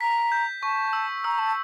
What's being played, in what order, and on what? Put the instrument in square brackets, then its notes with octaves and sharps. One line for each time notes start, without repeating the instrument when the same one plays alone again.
[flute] A#5 [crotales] B6
[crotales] G6
[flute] A5 [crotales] C#6
[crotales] E6
[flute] A#5 [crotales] E6
[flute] A5